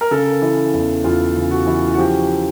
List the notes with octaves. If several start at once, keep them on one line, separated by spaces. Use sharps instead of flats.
A#4
C#3 A4
E3
E2
E2 F4
C#3
F#4
E3
F#4
F3 G4